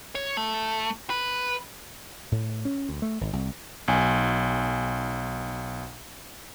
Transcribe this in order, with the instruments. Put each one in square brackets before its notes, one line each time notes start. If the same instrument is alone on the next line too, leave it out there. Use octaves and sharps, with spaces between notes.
[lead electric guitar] C#5
A3
B4
[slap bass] A2
C#4
D2
A3
G#1
C2
[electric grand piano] B1 G#5